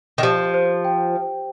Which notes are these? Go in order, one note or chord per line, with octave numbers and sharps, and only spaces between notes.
D#3
F3 G4
C5
G5